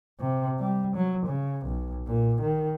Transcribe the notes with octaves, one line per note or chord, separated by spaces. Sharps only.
C3
G3
F#3
C#3
B1
A#2
D#3